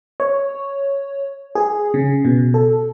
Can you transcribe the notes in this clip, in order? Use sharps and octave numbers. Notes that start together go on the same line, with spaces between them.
C#5
G#4
C#3
B2
A4